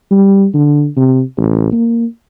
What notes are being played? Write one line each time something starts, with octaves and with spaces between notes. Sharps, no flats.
G3
D3
C3
A1
A#3